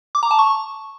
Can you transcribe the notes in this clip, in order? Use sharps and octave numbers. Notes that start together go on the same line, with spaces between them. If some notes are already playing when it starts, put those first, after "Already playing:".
D6
A#5
A5
C#6